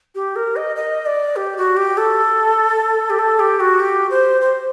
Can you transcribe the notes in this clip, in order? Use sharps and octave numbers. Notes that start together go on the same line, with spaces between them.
G4
A#4
D#5
D#5
D5
G4
F#4
G4
A4
G4
A4
G4
F#4
G4
C5
C5